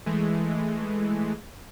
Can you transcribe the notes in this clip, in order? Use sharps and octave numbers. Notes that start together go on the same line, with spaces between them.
E3 G#3 A3